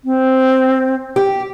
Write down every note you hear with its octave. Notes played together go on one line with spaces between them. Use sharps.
C4
G4